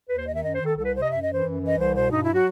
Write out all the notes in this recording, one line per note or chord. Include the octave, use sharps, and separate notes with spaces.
D#2 B4
C5
D#3 D#5
E5
F#2 D#5
C5
D#3
A4
C2 A4
B4
C3 C5
D#5
F#2 E5
D#5
E3 C5
F#2
E3 D#5
C2 C5
B2 C5
G2 D#4
E4
F#3
F#4